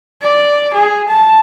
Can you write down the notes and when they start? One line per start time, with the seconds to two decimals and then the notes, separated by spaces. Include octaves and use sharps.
0.22 D5
0.74 G#4
1.09 A5